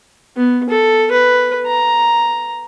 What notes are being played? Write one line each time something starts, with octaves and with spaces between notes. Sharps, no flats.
B3
A4
B4
A#5